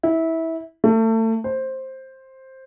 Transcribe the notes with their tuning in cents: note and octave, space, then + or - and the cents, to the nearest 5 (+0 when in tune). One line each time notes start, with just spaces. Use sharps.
E4 -20
A3 +30
C5 +10